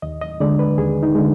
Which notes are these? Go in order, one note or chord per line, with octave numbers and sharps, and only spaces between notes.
D#2 D#5
D#5
D3 G#3 D5
B4
D#2 G#4
D#4
D3 G#3